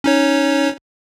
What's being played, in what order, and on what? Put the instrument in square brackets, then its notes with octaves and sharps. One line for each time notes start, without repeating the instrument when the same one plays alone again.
[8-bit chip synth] C#4 D#4 C#5